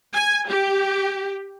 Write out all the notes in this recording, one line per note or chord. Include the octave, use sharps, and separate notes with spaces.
G#5
G4